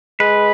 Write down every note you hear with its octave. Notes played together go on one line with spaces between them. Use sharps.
G#3 B4